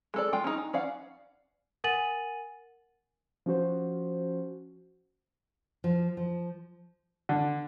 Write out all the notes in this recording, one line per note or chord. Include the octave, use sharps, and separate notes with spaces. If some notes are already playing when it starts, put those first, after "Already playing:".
G#3 A4 D5
G#3 F4 G5
C#4 D#4
D#4
C#4 D5 F5 F#5
A#4 F#5 G#5 A6 D#7 F#7
F3 C#4 F#4 C5
F3
F3
D3